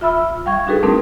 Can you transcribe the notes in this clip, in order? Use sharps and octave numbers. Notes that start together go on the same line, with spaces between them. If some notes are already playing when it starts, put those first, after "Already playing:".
F4 E5 B5 E6 F6
G3 F5 G5 C#6 G#6
D4 D#4 F#4 G#4 A4 B4
G3 A3 C4 D4 D#4 A#4